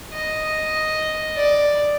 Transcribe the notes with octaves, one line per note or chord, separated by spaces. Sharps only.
D#5
D5